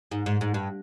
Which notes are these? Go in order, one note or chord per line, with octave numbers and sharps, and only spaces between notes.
G#2
G#2
G#2
G2